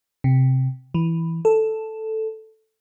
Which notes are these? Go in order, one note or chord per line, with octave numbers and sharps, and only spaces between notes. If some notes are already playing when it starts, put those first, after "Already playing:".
C3
E3
A4